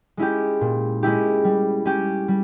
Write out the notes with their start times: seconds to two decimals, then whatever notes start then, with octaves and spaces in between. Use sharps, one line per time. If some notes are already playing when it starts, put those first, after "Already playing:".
0.17 G#3 C#4 E4 G4
0.61 A#2
1.03 G#3 C#4 E4 G4
1.44 G3
1.86 C#4 G4
2.28 G3